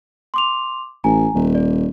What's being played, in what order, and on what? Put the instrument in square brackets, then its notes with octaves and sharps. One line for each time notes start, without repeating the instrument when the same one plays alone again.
[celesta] C6 D6 F7
[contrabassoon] A1 [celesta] G#5 A#5
[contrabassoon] D#1
[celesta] D5